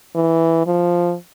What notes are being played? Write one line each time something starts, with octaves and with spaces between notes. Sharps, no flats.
E3
F3